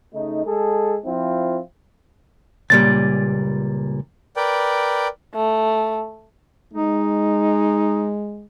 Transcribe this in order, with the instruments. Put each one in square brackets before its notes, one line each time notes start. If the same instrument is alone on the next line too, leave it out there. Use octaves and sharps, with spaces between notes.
[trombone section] C#3 A3 D#4
G#3 G#4 A4
F3 C4 E4 F4
[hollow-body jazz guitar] C#2 A#2 G3 [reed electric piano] A6
[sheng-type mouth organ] A#4 B4 D5 G5
[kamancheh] A3
[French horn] G#3 [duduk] D#4